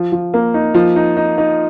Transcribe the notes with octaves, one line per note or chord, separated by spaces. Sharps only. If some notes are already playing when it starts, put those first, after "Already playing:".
Already playing: F3
F3
A#3
D#4
F3
D#4
D#4
D#4